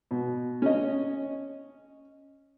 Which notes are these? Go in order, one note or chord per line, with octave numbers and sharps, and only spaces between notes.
B2
C#4 D#5